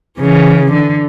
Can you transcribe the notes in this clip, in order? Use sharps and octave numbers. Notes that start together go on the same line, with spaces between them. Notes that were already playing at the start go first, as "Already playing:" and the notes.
C#3 E3
D3